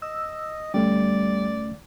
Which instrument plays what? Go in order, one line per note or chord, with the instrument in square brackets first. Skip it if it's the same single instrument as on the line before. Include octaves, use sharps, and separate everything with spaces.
[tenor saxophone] D#5 [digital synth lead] E6
[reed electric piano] D2 A3 C#4 [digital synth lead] G3 [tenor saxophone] D5